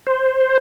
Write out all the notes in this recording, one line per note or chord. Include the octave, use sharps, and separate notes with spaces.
C5